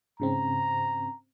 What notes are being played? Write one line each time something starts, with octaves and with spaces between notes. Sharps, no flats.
G#2 C#3 C4 A#5